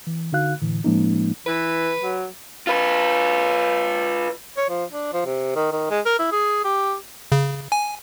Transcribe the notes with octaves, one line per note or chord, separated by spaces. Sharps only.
E3
D3 D#4 F#4 F5 F#6
A2 D3 E3
A2 F3 G#3 A#3 C#4 D#4
E3 B4
F#3
F4 B4
C#5
F3
D4
F3
C3
D#3
D#3
G#3
A#4
E4
G#4
G4
C#3
G#5